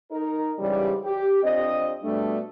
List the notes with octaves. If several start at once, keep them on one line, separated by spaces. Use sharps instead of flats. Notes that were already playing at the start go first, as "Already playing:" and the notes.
D#4 A#4
G#2 C#3 E3 G3
G4
F2 C4 D4 D#5
B2 G3 A3 D4